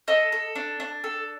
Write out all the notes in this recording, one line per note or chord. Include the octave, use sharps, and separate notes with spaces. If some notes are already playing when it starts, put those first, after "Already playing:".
A4 D#5
A4
D4
D4
A4